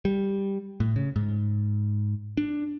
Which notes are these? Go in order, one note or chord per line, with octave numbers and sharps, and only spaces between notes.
G3
A2
C#3
G#2
D4